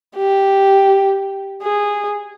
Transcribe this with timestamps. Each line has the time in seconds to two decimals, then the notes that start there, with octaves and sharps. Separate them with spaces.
0.16 G4
1.63 G#4